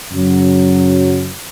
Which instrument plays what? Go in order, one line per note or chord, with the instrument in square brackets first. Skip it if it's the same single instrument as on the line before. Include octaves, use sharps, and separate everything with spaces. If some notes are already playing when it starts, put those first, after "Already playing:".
[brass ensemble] F#2 C#3 F#3